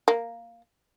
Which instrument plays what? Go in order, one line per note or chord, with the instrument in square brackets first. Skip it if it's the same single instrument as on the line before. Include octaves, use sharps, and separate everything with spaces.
[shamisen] A#3